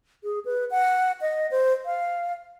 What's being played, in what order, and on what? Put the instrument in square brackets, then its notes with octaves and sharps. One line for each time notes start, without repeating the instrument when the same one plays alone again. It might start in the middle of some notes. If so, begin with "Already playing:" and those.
[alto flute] G#4
B4
F#5
D#5
C5
F5